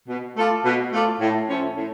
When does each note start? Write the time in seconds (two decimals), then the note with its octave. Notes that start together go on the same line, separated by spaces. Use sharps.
0.08 B2
0.36 A3 F4 A4 D5
0.64 B2
0.93 A3 F4 A4 D5
1.21 A2
1.49 F3 A3 C#4
1.76 A2